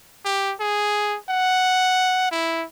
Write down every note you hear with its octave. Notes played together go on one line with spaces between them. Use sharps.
G4
G#4
F#5
E4